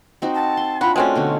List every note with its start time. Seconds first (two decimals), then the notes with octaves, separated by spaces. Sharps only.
0.22 C4 D#4 F#4
0.34 A5
0.57 C6
0.81 D4 F4 F#4 B5
0.96 G#3 A3 C4 C#4 F#4 D5
1.15 B2 D3 D#4